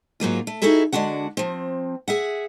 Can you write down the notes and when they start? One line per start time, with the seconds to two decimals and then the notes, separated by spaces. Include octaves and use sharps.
0.20 G#2 F#3 A#3 F4
0.47 A3
0.62 D#4 E4 F#4 G#4 A4 E5
0.93 D3 G#3 D4 F#4 F#5
1.37 F3 C4
2.08 G#4 E5 F#5